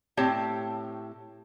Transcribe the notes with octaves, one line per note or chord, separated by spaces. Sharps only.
A2 C4 G4 C#5 G5 A5